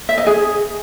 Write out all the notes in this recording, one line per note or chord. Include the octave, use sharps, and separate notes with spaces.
E5
D#5
G#4